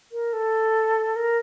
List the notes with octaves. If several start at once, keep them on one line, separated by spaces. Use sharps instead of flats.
A#4
A4
A#4